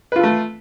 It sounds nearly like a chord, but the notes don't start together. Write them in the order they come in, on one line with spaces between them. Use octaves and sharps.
B4 F4 A4 A3